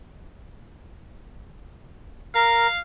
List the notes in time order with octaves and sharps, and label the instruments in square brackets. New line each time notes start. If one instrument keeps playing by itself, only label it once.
[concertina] A#4 [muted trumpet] F5